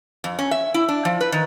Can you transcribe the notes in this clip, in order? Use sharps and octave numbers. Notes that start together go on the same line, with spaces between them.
F2
C#4
E5
E4
D4
F3
B4
D#3